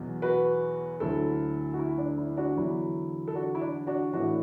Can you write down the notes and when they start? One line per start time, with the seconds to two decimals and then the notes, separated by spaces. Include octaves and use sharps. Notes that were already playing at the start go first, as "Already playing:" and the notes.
Already playing: E2 B2 F#3
0.22 F#4 B4
1.00 D2 D3 F#3 E4 A4
1.74 F#4
1.79 E4
1.98 D4
2.18 E4
2.37 D4 F#4
2.57 E2 D3 F#3 E4
3.28 A4
3.35 D4 F#4
3.55 E4
3.61 D4
3.87 D4 F#4
4.13 A2 E3 D4 F#4